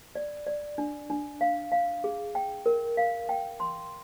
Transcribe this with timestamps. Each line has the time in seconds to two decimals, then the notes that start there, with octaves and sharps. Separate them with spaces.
0.15 D5
0.47 D5
0.78 D4
1.10 D4
1.41 F5
1.72 F5
2.04 G#4
2.35 G5
2.66 A#4
2.97 F5
3.29 G5
3.60 C6